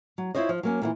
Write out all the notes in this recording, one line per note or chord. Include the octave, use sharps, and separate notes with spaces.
F#3
E4 F4 C5 C#5 D#5
F3
F#3 A#3 C#4
A#2 C#3 E3